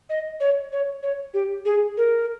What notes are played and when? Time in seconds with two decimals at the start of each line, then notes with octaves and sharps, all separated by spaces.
0.10 D#5
0.40 C#5
0.72 C#5
1.03 C#5
1.34 G4
1.65 G#4
1.97 A#4